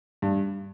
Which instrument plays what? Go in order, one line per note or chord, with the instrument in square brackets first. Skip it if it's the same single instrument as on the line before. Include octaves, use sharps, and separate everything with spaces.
[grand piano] G2